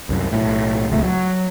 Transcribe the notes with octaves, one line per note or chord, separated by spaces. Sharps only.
C2 F#2
B1 A2
D#1 C#2 A3
F#3